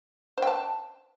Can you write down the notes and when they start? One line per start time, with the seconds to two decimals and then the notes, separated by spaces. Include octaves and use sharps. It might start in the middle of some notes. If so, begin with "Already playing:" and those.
0.38 C5
0.42 G5
0.47 A5